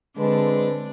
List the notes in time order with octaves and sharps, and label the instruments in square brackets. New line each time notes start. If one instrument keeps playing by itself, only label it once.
[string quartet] D3 C4 [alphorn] G#3 [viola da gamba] D4 [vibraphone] B4 B5 C6